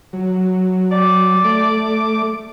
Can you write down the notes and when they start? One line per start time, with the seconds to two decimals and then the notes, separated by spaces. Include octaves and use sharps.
0.13 F#3
0.92 D5
1.44 A3 D6